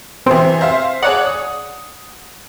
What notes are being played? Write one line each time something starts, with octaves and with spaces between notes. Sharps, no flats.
C3 E3 C4
C5 E5 F5
G#4 C#5 D5 F#5
D#6